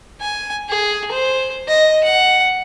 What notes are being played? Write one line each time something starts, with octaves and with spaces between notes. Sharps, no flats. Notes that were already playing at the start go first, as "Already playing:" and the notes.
G#5
G#4
C5
D#5
F#5